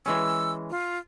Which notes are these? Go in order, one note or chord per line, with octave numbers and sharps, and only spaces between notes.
E3 G#3 C#4 E6
F4